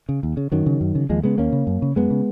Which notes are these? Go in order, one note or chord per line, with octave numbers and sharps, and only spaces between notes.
C#3
D#2
C#3
F#2 D#3 F#3
C#3
F#2
C#3
D#2 F3 G#3
C#3 G#3 B3
D#2 A#3 C#4
C#3
F#2
C#3
F#2 G#3 B3
C#3